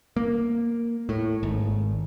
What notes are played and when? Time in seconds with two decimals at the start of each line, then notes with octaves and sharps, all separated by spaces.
0.16 A#3
1.09 A2
1.43 G#1